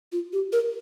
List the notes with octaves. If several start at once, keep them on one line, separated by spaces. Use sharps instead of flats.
F4
G4
A#4